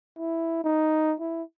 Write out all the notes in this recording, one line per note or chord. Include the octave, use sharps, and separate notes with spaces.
E4
D#4
E4